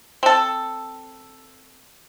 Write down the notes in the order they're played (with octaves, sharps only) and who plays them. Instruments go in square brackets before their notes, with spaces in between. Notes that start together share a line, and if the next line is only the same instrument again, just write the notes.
[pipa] C4 A4